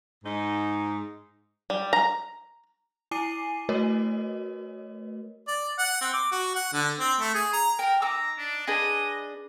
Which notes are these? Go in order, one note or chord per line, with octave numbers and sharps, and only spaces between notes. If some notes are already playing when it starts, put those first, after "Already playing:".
G#2 D#4
G3
A#5
E4 G#5 D6 C7 D#7
A3 F#4 A#4 B4 C#5 D#5
D5
F#5
C4
D6
F#4
F#5
D3
C4
A3
G#4
A#5
A#4 G5
D#4 A#5 D6 E6
D4
D4 G#4 B4 D#5